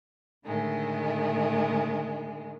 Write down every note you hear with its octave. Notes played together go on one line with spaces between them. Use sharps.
A2 D3 D#3 G#3 A3